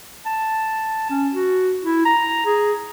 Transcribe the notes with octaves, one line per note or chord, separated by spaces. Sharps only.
A5
C#4
F#4
E4
A#5
G#4